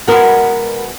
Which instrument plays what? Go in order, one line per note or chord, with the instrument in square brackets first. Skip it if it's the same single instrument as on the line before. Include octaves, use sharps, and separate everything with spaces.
[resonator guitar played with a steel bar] B2 G#3 B3 F#4 [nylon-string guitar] A#4